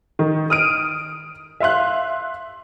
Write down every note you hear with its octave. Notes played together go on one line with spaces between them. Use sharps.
D#3
D#6 F6 D7
E5 F5 C6 F#6